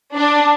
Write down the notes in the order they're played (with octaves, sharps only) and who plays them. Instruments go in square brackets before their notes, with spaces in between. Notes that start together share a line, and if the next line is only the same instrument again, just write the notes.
[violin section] D4